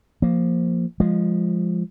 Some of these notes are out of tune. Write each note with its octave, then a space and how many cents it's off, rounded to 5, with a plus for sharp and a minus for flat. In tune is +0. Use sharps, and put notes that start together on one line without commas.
F3 +0 A#3 +0
F3 +0 G#3 -15